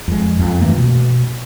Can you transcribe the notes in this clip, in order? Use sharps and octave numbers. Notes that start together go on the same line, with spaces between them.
F2 G#3
F2
G2 E3 A3 A#3
B2